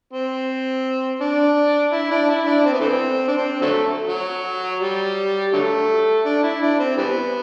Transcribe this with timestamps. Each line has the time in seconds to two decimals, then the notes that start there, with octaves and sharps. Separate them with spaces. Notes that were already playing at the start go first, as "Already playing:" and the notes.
0.13 C4
1.21 D4
1.93 E4
2.11 D4
2.29 E4
2.47 D4
2.66 C4
2.73 B3
2.80 E3 A3 C4
3.28 D4
3.37 C4
3.61 D3 F#3 A3
4.09 F#3
4.82 G3
5.53 D3 F#3 A3
6.25 D4
6.43 E4
6.62 D4
6.79 C4
6.97 E3 G3 B3